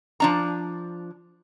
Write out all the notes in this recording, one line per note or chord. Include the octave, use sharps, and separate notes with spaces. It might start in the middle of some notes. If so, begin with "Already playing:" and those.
F3 D4 A#5